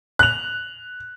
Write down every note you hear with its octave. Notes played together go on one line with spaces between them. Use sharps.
F#6 F7